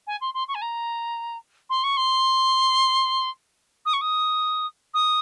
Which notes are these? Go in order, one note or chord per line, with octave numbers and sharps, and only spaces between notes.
G#5
C6
C6
C#6
G#5
A#5
C6
C#6
C6
D#6
C#6
D#6
D#6